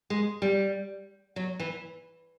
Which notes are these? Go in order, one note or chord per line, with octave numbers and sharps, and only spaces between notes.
G#3
G3
F#3
E3